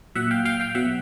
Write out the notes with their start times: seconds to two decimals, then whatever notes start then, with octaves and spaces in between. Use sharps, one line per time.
0.15 A#2 F#3 E5 F#5
0.31 F5 G5
0.45 F5 G5
0.60 F5 G5
0.75 B2 F#3 E5 F#5